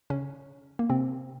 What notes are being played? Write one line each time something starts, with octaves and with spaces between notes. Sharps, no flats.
C#3 C#4
A#3
C3 C4